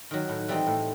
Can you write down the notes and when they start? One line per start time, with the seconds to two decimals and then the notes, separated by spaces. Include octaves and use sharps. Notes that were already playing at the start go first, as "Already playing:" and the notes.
0.11 D#3 F#3
0.29 A2
0.48 E3 G3 C4 D#4
0.67 A2